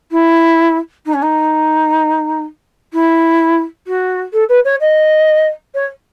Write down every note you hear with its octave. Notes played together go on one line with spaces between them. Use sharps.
E4
D#4
C#4
D#4
E4
F#4
A4
B4
C#5
D#5
C#5